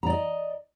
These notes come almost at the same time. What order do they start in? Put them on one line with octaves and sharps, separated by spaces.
A#5 D5 D#5